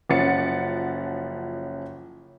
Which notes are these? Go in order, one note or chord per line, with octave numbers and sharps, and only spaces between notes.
F#1 F3 C#4 F#5 A6 C#7